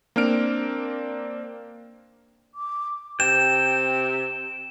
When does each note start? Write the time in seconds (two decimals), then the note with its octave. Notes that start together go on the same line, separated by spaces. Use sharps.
0.16 A#3 C4 D4 F6 D7
2.55 D6
3.20 C3 G5 E7